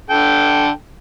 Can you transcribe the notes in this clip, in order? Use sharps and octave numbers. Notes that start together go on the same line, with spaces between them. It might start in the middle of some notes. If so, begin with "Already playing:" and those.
D3 A4 G5